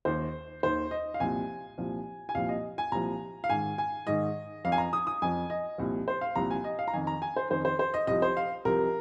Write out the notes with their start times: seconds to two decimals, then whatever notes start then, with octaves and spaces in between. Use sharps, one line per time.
0.05 D#2 D#3 C5
0.63 D#2 D#3 C5
0.91 D#5
1.14 F5
1.20 C2 A#2 F3 G#5
1.78 C2 A#2 F3
2.29 G#5
2.35 C2 A#2 F3 F5
2.49 D#5
2.78 G#5
2.92 C2 A#2 F3 A#5
3.44 F5
3.50 G#2 D#3 G#5
3.78 G#5
4.07 G#2 D#3 D#5
4.64 F2 F3 F5
4.72 G#5
4.78 A#5
4.93 D#6
5.07 D#6
5.22 F2 F3 G#5
5.50 D#5
5.78 C2 A#2 F3
6.08 C5
6.21 F5
6.35 C2 A#2 F3 A#5
6.51 G#5
6.64 D#5
6.79 F5
6.88 A#5
6.93 F2 D#3 G#5
7.07 A#5
7.22 G#5
7.36 C5
7.50 F2 D#3 C5
7.65 C5
7.79 C5
7.94 D#5
8.07 C2 C3 F3 D#5
8.22 C5
8.37 F5
8.65 C2 C3 F3 A#4